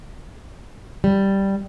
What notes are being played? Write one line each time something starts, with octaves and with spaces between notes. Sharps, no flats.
G3